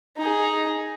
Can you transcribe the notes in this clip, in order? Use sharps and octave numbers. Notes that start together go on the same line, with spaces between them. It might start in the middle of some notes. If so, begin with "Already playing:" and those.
D#4 G#4